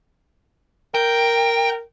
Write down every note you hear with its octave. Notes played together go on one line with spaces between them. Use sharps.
A#4 G5